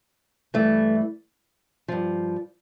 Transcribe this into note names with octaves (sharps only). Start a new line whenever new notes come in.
G2 E3 A3
G2 F3